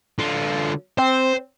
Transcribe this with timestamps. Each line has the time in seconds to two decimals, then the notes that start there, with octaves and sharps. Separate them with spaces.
0.19 D3 F4
0.98 C4 C5